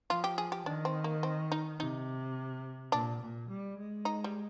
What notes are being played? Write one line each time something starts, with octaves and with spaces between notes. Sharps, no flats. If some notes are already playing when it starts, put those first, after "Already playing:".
F3 F4
G4
G#4
G4
D#3 D4
C4
A#3
C4
D#4
C3 D#4
A#2 D4
A#2
G3
G#3
D#4
G3